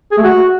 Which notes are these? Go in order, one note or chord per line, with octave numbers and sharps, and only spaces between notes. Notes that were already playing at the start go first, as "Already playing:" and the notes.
G#4
A3
F#4